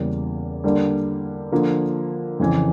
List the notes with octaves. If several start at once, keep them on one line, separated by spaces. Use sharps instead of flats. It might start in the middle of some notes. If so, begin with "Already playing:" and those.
Already playing: E2 C#3 G3 A#3
D3 G3 A#3 D4
D3 F3 A#3
F2 C#3 E3